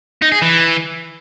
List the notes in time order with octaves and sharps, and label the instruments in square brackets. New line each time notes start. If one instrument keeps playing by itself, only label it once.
[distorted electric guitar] D#4
G#4
E3